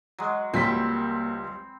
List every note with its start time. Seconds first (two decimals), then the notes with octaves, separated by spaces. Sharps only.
0.19 F#3 G#3
0.54 C#2 F#3 G3 A#3 C4 G5 B5 B6